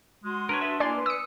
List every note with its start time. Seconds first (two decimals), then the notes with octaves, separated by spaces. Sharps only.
0.24 G#3 F#4 C6 D#6
0.49 D4 A#4 B4 C#5
0.61 A4 B4 E5
0.80 A#3 E4 D5 G#5 C6
0.93 B4
1.06 D#6 E6 C#7